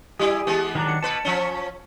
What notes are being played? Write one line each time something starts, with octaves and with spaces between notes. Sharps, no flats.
G3 E4 G4 G#4
E3 G#3 B3
D#3 F#3 D4 A#5
C#7
B2 B4 A5
F3 C#4